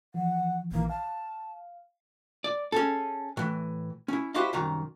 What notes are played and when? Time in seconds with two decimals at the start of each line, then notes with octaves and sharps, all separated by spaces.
0.14 E3 F3 F#5
0.72 A#1 D#3 E3 A#3
0.90 F5 A5
2.44 D5
2.72 C#4 G#4 A4
3.37 A2 E3
4.08 C#4 E4
4.34 E4 F#4 G4 C5 D#5 F5
4.53 C2 F#2 D#3 A#5